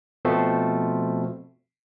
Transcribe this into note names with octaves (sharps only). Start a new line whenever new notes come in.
B2 F3 A3 C4